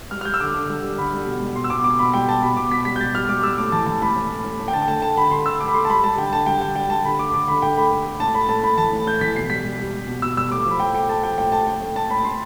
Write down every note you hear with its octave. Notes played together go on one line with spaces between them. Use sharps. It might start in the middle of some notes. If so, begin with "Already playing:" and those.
G3 F6
F6
G3 G6
E6
D3 D6
D3
G3
G3
D3 B5
G3
B2
G3
B2 C6
E6
B2 D6
B2 D6
B2 B5
G3 G5
G3 A5
B2 B5
B2 D6
B2 B6
G3 B6
G6
G3 A6
G3 F6
G3 D6
G3 E6
A2 D6
E3 A5
E3 A5
A2 B5
A2
A2
A2
A2
G5
D3 A5
G5
A3 A5
A3 A5
D3 B5
D3 C6
D3 E6
A3 D6
B5
A3 C6
A5
G3 B5
G3 A5
D3 G5
D3 A5
G3 G5
D3 G5
G3 G5
G3 A5
D3 B5
A3 D6
D3 D6
D3 B5
D3 G5
A3 B5
A3
A3
A2 A5
A2 B5
A2 A5
A2 B5
E3 A5
A2
A2 G6
E3 B6
B2 C7
G3 B6
G3
G3
G3
B2
B2 E6
G3 E6
A2 D6
F3 B5
A3 G5
A3 G5
A3 A5
F3 G5
A2 G5
A3 A5
A2 G5
A2
A2 A5
A2 B5
A2 C6